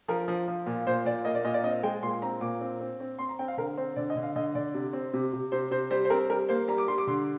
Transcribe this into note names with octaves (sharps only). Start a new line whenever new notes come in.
F3 A#4
F3
F3
A#2
A#2 C5
A#2 D5
A#3 D#5
D5
A#2 D#5
D5
C4 D#5
G#3 G5
A#2 C6
C4 A#5
A#2 D6
C4
C4
C4
C4 C6
A#5
C4 G5
F5
D3 A#4
C4 C5
D3 D5
D#5
D3
F5
D3 D#5
D3 D5
C3
C4
C3
C3
C3 C5
C3 C5
G3 C5
C5
C4 A#4
G3 A#4
A#3 C5
G3 A#5
D6
G3 C6
D6
D3 C6